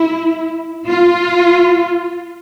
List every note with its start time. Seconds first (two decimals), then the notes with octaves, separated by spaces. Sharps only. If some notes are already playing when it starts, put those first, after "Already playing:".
Already playing: E4
0.87 F4